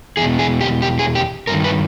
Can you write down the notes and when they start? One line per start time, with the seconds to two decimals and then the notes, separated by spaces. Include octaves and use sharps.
0.17 E2 B2 G#4
0.39 G#4
0.61 G4
0.82 G4
0.99 G#4
1.15 G4
1.47 G2 D#3 A#4
1.64 B4